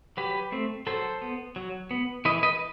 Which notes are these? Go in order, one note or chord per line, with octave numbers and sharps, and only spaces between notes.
F#3 G4 B4
A3 C4
F#3 A4 C5
B3
F#3
B3
E3 B4 D#5
B4 D#5